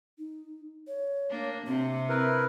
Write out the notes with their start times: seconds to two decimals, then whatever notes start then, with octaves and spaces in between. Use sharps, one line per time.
0.18 D#4
0.87 C#5
1.30 A#3 D4
1.67 C3 C4
2.09 E4 A#4 B4